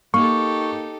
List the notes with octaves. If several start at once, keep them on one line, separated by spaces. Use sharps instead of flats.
A#3 D#4 G4 A4 C#6